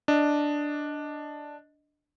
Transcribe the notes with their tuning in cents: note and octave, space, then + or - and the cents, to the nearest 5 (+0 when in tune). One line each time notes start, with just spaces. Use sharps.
D4 +0 D#5 +0